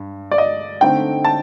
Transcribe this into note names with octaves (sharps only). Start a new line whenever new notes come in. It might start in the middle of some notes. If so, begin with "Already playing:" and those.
Already playing: G2
D5
D#5
D3 A3 C4 D#4 G5
A5